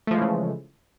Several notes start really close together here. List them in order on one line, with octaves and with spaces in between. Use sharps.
A3 F3 G#3 E3 C#3